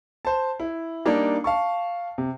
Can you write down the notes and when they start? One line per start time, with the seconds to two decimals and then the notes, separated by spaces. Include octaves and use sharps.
0.25 C5 A5
0.60 E4
1.05 G3 A#3 D4 D#4
1.44 F5 A5 C#6
2.18 C3